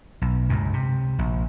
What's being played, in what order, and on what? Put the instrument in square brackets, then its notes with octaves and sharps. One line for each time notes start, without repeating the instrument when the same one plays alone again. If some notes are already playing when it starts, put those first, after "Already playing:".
[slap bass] B1
C#2 G2 A#2
C3
A#1